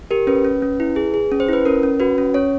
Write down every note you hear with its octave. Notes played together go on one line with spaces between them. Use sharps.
G4 A#4
C#4 B4
C#4
C#4
E4
G#4
G#4
C#4
C5
E4 B4
C#4 A#4
C#4
F#4 B4
C#4
C#4 C#5